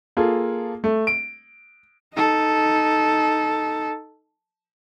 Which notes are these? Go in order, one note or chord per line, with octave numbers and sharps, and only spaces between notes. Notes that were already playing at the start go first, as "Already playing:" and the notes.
A#3 F4 G#4 A4
A3
D7
D#4 A4